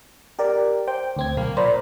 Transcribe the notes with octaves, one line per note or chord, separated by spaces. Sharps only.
G4 A#4 D5
C5 G5
D2 C4 G#6
B1 A#3
A#2 C5 A#5 B5